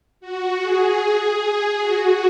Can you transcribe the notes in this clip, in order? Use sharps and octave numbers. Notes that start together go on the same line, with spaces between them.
F#4
G#4
F#4